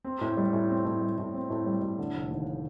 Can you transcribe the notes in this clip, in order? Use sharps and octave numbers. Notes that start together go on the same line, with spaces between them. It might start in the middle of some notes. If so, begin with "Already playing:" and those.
C4
A2
G3
A2
C4
A2
G3
A2
C4
A2
G3
A2
D3
F1
D#2